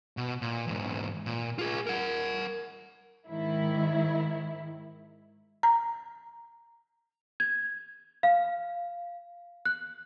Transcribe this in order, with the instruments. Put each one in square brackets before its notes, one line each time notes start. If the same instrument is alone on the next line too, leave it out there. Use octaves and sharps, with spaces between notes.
[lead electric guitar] B2
A#2
E2 G#2
A#2
F4 G#4
A#4 F#5
[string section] G#2 D#3 E4
[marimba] A#5
[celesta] G#6
F5
F#6